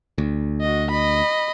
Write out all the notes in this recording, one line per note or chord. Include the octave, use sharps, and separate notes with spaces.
D2
F#4 D#5
D#5 B5